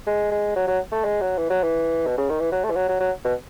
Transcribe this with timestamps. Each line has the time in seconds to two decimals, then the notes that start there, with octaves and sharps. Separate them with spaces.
0.07 G#3
0.31 G#3
0.56 F#3
0.68 F#3
0.92 A3
1.04 G#3
1.21 F#3
1.38 E3
1.50 F#3
1.63 E3
2.07 B2
2.18 C#3
2.30 D#3
2.40 E3
2.52 F#3
2.64 A3
2.71 E3
2.76 F#3
2.89 F#3
3.00 F#3
3.24 B2